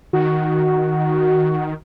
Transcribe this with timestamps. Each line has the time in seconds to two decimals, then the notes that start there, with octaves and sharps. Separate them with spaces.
0.13 D#3 F#4